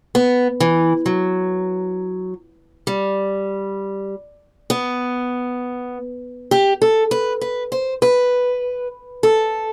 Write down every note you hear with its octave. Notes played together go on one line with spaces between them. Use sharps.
B3
E3
F#3
G3
B3
G4
A4
B4
B4
C5
B4
A4